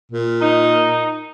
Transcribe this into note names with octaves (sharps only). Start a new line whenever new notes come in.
A#2
D#4